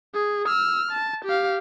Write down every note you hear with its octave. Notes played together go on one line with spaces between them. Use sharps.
G#4
E6 F6
A5
G4 F5